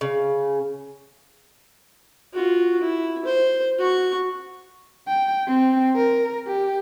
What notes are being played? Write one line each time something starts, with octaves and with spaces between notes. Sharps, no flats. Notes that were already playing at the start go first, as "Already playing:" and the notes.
C#3
F4 F#4
E4
C5
F#4 C#6
G5
C4
A#4
G4